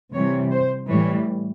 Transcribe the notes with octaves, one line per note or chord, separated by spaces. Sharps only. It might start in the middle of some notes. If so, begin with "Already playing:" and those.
C3 E3 G3 C#5
C5
A2 E3 G3 C#5